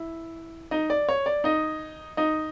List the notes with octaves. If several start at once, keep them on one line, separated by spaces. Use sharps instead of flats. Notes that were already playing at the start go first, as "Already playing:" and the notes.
Already playing: E4
D#4 D#5
D5
C#5
D5
D#4 D#5
D#4 D#5